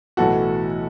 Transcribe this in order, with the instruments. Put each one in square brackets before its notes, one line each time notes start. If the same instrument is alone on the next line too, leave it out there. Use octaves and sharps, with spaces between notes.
[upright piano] B1 A2 E3 F#4 A4